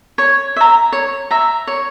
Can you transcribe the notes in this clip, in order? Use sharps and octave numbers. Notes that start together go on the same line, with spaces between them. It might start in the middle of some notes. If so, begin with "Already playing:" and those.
C#5
E5 A#5
C#5
E5 A#5
C#5